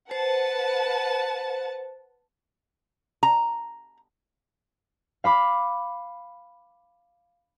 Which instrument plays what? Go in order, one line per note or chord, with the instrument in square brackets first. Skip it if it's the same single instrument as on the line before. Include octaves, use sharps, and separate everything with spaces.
[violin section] B4 F#5 A5 [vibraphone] C5
[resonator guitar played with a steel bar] A#5
[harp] F5 B5 D6